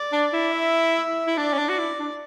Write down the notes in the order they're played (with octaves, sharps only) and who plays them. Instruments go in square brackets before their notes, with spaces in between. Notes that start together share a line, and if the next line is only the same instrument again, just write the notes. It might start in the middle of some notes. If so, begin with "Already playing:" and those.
Already playing: [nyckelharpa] D5
[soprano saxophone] D4
E4
[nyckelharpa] E5
[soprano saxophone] E4
[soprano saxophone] D4 [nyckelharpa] D5
[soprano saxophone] C#4
D4
F#4
E4
D4